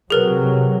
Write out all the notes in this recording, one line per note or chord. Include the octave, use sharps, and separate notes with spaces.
C3 F#3 G#4 A#4 B4